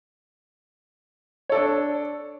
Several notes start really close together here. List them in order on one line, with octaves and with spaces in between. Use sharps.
C#5 A4 D5 D4